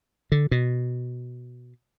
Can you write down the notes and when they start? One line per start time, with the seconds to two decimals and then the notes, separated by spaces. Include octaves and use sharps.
0.32 D3
0.51 B2